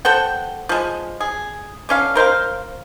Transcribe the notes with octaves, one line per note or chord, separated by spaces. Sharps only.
A4 C5 F#5 G5
F3 G#3
G#4
D3 C#4 F5
A#4 C5 E5 F5